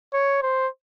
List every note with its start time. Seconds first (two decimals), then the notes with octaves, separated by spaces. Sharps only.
0.13 C#5
0.42 C5